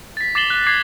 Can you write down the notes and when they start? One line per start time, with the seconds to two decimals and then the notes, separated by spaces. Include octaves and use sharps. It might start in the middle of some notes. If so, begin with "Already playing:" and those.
0.17 A6 B6
0.35 D6 A6 C7 E7 F#7 G7
0.50 F#6
0.67 D6 G#6 A6 C7